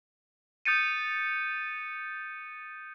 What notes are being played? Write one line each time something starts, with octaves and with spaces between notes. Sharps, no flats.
D#6 G6 A6 C#7 D#7